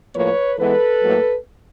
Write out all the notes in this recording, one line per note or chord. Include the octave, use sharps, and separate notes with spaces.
A2 F3 A#3 B4 C#5
E3 G#3 B3 A4 B4
A2 F#3 A#3